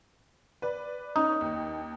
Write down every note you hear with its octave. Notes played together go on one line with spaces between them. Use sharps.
B4 D5
C#4 D#4
D#2